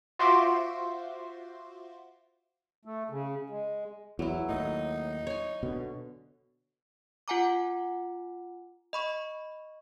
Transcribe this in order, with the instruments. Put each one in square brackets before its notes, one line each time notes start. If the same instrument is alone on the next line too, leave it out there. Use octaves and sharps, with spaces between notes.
[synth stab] F4 F#4 C5 E5 C6 D6
[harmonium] A3
C#3
G#3
[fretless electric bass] E2 [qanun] F#3 E4
[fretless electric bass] D#2 A2 [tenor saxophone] D#4
[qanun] C#5 G#5
[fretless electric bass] B2 D3
[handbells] F4 F#5 G#5 A#5 D6
D#5 B5 C#6